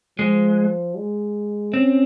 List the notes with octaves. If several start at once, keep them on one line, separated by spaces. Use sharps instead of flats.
F3 G#3
G#3
C4 C#4